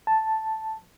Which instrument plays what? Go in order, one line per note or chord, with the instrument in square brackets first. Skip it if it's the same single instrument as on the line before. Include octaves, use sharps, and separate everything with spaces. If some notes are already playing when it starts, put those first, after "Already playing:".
[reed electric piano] A5